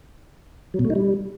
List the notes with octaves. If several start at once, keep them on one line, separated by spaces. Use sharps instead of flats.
F#3
B2
A3
D#4
G3